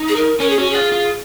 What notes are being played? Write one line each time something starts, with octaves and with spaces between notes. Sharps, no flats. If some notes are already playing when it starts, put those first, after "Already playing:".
Already playing: D#4
G#4
A#4
C#4 A#4
G#4
C#4 F#4
F4 G#4
F4